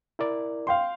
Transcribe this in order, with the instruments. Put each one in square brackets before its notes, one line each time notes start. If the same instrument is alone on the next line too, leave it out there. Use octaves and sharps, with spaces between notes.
[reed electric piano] E4 A#4 D5
[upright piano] F5 G5 C6